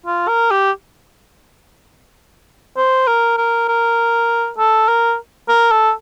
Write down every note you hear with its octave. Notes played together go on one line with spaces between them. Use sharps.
F4
A#4
G4
C5
A#4
A#4
A#4
A4
A#4
A#4
A4